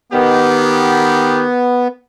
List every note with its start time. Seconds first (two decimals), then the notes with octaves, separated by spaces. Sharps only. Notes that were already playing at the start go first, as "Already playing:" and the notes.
0.12 D#3 B3 G4